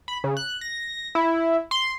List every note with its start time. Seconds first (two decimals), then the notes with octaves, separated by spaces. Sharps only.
0.08 B5
0.24 C#3
0.37 F#6
0.61 A#6
1.15 E4
1.71 C6